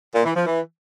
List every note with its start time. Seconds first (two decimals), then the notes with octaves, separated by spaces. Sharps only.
0.14 A#2
0.25 E3
0.35 F3
0.46 E3